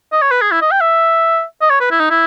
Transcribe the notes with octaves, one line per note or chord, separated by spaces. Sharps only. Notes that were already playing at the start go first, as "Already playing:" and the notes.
D#5
C#5
B4
G#4
E4
D#5
G5
E5
D#5
C#5
B4
E4
D#4
E4